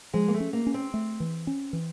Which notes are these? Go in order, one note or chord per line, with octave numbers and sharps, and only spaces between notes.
F3 G#3
A#3
A3
C#4
A#3
C#4
C4
A3
E3
C#4
E3